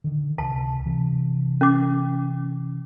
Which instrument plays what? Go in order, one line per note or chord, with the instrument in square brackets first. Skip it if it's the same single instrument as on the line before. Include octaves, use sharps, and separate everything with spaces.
[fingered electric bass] D3 D#3
[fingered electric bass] C#2 C3 [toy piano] A5
[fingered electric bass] C3 E3
[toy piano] C#4 D6